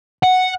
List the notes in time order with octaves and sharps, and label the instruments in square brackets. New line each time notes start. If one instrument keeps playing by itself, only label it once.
[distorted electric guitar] F#5